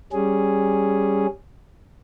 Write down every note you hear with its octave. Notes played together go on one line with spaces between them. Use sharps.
G3 C#4 G#4